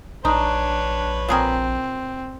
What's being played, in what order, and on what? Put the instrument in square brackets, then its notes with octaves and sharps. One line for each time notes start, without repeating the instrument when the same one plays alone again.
[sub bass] A#1 [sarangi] D4 [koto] D#4 [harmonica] B4 C#5
[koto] A#2 G#4 A#4 [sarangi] C4